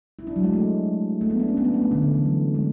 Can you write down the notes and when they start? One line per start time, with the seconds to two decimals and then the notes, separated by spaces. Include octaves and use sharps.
0.19 E4
0.27 D4
0.36 F#3
0.43 G#3
0.53 A3
1.21 A3
1.30 B3
1.40 D4
1.48 C#4
1.57 B3
1.64 D4
1.74 B3
1.82 A3
1.91 D3
2.02 D3
2.14 E3
2.25 F#3
2.54 G#3